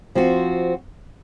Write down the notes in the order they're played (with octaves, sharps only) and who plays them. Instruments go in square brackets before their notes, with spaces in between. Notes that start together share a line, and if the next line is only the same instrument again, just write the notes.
[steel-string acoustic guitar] F3 C4 F#4